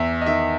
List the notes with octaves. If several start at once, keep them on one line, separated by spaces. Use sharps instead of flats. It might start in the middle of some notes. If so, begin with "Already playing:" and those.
Already playing: E2 E5
D#5
D#3 E5